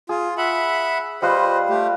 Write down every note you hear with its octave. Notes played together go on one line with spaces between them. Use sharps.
F4 G#4
E5 F#5 B5
G3 F4 B4 C5 D#5
A3 G4